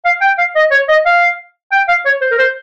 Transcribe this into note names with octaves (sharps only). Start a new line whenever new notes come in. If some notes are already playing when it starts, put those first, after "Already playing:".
F5
G5
F5
D#5
C#5
D#5
F5
G5
F5
C#5
C5
A#4
C5